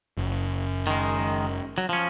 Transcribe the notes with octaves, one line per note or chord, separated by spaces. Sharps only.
F#1
D#3 G#3
F#3
F3 C#4